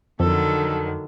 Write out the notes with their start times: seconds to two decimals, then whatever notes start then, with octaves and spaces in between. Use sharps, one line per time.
0.20 F2 D3 D#3 F#3 A4